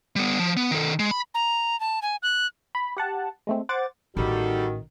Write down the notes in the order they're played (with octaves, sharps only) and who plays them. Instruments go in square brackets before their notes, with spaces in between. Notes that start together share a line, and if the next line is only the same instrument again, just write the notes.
[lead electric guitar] G3 B3
F3
B3
D#3 A4
G#3
B5
[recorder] A#5
A5
G#5
F#6
[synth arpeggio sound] B5
G4 F#5 A5
G#3 A3 C4
C5 F#5 D6 A6
[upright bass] A1 [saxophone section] D#3 [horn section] G3 A4 [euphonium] F#4